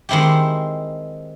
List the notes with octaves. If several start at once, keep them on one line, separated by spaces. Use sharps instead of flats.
D#3 G#3 C4 E4 G4